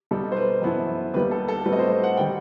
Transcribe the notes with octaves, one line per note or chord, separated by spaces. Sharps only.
B2 G3 D#4 A4
C5
B4
F#2 E3 B3 E4 A4
D#2 D#3 G3 B3 B4
A4
A4
A2 G3 C4 F#4 B4
D#5
C5
C5
F#5
D#3 G3 G5